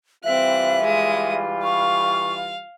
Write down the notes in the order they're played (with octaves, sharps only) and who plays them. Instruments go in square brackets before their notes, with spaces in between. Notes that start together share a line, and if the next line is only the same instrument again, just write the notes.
[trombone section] E3 G3 F4 [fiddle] C4 F#6 [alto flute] E5
[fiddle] G#3 D#6
[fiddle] F5 [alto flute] C#6